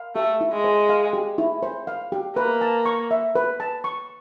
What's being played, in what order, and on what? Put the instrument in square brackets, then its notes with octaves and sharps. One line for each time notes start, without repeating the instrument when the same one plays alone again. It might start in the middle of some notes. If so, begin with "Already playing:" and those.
Already playing: [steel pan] F5
[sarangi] A3 [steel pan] G4
[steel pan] E4
[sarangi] G#3
[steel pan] C5
F5
G4
E4
C5
F5
G4
[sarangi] A#3 [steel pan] B4
[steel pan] A5
C#6
E5
B4
A5
C#6